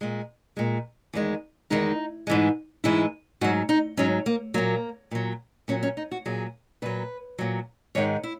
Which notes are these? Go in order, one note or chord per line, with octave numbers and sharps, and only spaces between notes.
A#2 G#3
A#2 G#3
E2 D#3 G#3
E2 D#3 G#3 D#4
G#2 E3 G#3
G#2 E3 G#3 E4
G#2 F#3 F#4
D#4
G#2 F#3 C#4
A#3
A#2 F#3 A#3
A#2 F#3
A#2 F#3 C#4
C#4
D#4
F#4
A#2 F#3 G#4
A#2 F#3 B4
A#2 F#3
G#2 D#3 G#3 C#5
E4